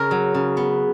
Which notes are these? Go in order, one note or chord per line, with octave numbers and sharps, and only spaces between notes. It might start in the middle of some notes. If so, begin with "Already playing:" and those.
Already playing: C#3 A#4
F#3
C#3
B3